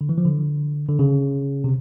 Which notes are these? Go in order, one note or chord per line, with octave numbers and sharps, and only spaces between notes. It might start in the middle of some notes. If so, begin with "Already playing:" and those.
D3
E3
F3
D3
D3
C#3
C3